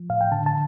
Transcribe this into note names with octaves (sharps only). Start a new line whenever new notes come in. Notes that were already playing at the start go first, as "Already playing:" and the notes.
Already playing: F3
A2 F5
G5
D3 A5
A5